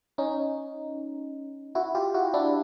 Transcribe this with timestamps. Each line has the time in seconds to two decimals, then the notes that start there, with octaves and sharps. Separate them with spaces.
0.18 C#4 D#4
1.75 E4 F#4
1.95 F4 G4
2.14 E4 F#4
2.34 D4 E4